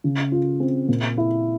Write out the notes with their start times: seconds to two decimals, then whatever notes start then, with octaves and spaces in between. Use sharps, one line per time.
0.04 C#3
0.32 F4
0.60 C4
0.88 A#2
1.18 E4